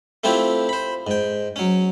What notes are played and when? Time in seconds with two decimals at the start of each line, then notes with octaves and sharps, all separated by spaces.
0.24 A3 C4 E4 F4 G4
0.69 C5 B5
1.07 G#2 G5
1.56 F#3 C#4